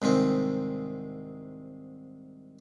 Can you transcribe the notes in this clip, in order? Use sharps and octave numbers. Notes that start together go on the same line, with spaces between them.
C2 G#2 D#3 C4